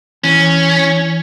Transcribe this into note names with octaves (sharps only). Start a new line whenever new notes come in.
E3 C#4